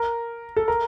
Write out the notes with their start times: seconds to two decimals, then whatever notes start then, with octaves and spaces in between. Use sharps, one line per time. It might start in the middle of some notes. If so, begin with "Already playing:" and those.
Already playing: A#4
0.56 A4
0.68 A#4